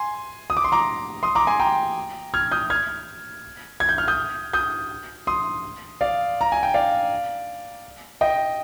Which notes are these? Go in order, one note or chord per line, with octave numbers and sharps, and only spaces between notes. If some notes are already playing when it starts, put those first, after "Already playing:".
Already playing: G#5 C6
D#6
D6
C6
A#5 D6
C6 D#6
A#5 D6
G#5 C6
G5 A#5
F6 G#6
D#6 G6
F6 G#6
G#6
G6
F6
D#6 G6
D#6 G6
C6 D#6
D5 F5
A#5
G#5
G5
D5 F5
D#5 G5